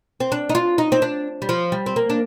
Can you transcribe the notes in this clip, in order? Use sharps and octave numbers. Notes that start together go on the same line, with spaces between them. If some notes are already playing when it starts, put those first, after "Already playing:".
C4
D4
D#4
F4
D#4
C4
D4
G3
F3
G3
C4
A#3
D4